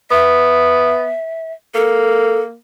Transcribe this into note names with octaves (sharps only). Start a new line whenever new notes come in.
B3 E5
A#3 A4